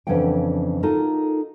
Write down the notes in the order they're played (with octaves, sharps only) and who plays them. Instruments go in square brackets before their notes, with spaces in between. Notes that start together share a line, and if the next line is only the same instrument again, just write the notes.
[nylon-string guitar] F2 C#3 E3 D4 F#5 G5
D#4 F4 F#4 A4 A#4